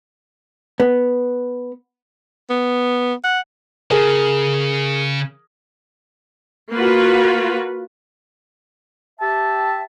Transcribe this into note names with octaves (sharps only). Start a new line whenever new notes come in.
B3
B3
F#5
C#3 G#4 A#4
A#3 F4 F#4 B4
G4 E5 A5